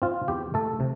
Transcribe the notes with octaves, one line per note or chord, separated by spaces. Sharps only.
C4 F4
E2 G4
A3 A4
C3